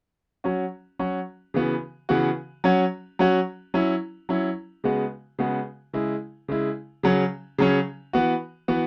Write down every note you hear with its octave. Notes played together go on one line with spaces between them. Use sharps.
F#3 C#4 F#4
F#3 C#4 F#4
C#3 E3 B3 F#4
C#3 E3 B3 F#4
F#3 C#4 F#4
F#3 C#4 F#4
F#3 C#4 E4
F#3 C#4 E4
C#3 G#3 B3 F#4
C#3 G#3 B3 F#4
C#3 G#3 E4
C#3 G#3 E4
C#3 F#3 C#4
C#3 F#3 C#4
E3 B3 F#4
E3 B3 F#4